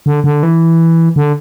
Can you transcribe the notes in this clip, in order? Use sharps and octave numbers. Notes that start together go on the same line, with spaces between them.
D3
D3
E3
D3